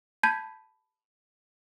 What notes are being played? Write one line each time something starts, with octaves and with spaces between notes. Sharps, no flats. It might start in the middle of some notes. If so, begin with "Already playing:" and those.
A5 B5 G6 G#6 B6 D#7